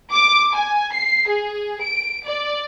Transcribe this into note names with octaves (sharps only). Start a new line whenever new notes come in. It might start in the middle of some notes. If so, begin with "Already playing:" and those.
D6
G#5
C7
G#4
D7
D5